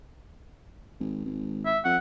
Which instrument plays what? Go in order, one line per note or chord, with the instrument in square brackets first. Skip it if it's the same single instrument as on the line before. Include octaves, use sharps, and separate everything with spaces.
[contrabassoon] G#1
G#1
[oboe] E5
[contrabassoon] F2 [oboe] F#5